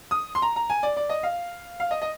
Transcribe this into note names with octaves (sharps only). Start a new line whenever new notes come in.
D#6
C6
A#5
A#5
G#5
D5
D5
D#5
F5
F5
D#5
D#5